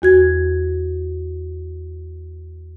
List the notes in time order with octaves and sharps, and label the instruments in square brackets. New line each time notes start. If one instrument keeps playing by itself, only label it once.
[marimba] E2 F#4 G#6